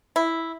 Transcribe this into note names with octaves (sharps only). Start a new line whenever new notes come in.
E4